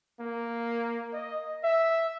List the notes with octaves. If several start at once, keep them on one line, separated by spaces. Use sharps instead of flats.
A#3
D#5
E5